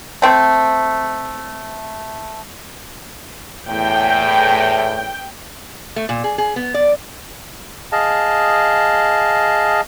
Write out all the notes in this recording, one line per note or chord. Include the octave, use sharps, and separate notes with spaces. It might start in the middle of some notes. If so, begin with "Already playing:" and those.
A3 C4
E2 A2 G5
A3
A#2
G#4
G#4
B3
D5
G#4 D#5 F5 A5